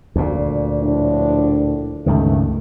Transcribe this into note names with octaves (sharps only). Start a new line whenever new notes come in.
D2 A#2
A2 F3 D4
C#2 G2 D#3 A3